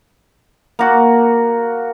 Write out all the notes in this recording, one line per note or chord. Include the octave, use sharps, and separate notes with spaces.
A#3 F#4